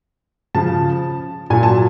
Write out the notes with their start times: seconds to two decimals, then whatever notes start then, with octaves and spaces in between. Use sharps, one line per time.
0.55 C#3 F3 A5
1.50 A#2 F#3 G#5
1.63 A5